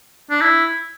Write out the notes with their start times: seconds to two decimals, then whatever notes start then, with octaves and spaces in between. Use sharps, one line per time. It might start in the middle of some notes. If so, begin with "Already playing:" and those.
0.30 D4
0.41 E4